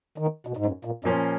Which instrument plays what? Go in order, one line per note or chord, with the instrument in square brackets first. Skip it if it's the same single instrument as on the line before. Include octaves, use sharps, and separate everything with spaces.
[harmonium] D#3
B2
G#2
F#2
A#2
[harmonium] F#2 [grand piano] A#2 F3 A#3 C#4